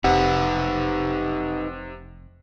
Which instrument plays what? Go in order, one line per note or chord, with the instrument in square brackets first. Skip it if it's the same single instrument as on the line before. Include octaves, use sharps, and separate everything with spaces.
[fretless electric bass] F1 [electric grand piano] C3 [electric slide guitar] D#4 B4 [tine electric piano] F#5